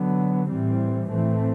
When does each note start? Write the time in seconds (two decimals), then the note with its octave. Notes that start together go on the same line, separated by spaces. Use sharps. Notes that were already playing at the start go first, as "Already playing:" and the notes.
Already playing: D3 F#3 B3
0.49 A2 E3 G3 C4
1.09 A2 E3 A3 C4